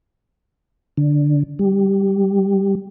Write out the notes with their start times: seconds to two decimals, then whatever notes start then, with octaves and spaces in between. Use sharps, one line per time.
0.98 D3
1.59 G3